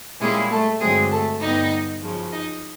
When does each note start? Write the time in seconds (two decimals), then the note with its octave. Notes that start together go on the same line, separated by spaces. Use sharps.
0.20 A#2 G3 G#3 A#3 C#4 E4 G#4
0.51 A3 A4
0.80 G2 D3 F#3 G#3 A3 C4 G#4
1.11 A3 A4
1.41 G2 D3 G3 B3 D#4 D#5
2.01 F#2 C#3 F3
2.32 D#4 D#5